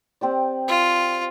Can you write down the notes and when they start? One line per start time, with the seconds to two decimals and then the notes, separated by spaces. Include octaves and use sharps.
0.21 C4 G4 D5
0.68 F4